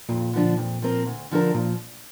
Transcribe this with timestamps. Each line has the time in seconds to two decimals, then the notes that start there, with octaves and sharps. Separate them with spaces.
0.09 F2 A#2
0.33 D3 F3 D4
0.58 F2
0.82 F3 C4 A#4
1.06 D2
1.31 D3 F3 D4 A#4
1.55 A#2 F3